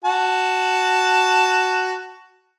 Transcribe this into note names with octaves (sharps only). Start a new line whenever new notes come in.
F#4 A5